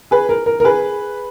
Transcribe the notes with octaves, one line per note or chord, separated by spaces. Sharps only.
G#4 B4
A#4
A#4
A#4
G#4 B4